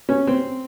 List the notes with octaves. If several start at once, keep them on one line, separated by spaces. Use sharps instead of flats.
C#4
C4